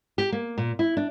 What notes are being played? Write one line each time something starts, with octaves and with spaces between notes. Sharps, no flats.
G4
A#3
A#2
E4
D4